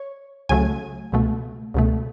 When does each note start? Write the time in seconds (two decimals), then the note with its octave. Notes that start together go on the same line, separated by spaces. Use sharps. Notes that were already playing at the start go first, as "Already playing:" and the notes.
Already playing: C#5
0.49 C#2 C#3 F#3 A3 G#5
1.12 C#2 B2 A3
1.74 C#2 B2 A3